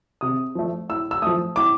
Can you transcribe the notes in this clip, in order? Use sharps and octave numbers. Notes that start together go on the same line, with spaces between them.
C3 D#6
F3 A3
A2 E6
E6
F3 A3 D#6
A2 D6